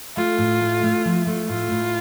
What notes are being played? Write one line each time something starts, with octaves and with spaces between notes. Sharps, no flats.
A3 F4
A2
A3
A3
F3
A3
A2 F4
A2